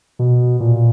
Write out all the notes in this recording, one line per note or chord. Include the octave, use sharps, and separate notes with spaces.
B2
A#2